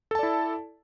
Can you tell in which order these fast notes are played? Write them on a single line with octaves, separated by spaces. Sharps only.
A4 A5 D5 E4